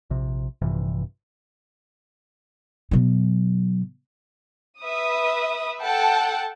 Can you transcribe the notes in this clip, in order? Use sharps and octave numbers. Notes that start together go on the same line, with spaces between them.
A#1 C3
A#1 G2 C3 E3
B2 F#3
B4 E5 D#6
A4 F#5 G5 A5